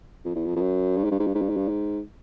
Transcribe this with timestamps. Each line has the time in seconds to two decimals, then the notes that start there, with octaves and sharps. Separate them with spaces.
0.25 F2
0.35 E2
0.46 F2
0.56 F2
0.61 F#2
0.97 G2
1.04 G#2
1.11 G2
1.19 G#2
1.27 G2
1.35 G#2
1.41 G2
1.49 G#2
1.57 G2
1.68 G#2